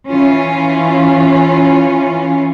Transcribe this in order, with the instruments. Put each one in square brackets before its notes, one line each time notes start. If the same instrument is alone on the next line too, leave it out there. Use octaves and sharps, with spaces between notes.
[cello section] E3 C#4 F4